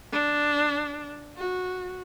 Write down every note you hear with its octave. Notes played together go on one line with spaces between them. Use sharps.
D4
F#4